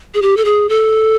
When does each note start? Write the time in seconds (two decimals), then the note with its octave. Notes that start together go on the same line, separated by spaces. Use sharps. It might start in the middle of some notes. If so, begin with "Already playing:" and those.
0.14 G#4
0.22 G4
0.37 A4
0.45 G#4
0.69 A4